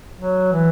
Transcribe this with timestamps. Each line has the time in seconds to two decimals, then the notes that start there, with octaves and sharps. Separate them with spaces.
0.15 F#3
0.52 E3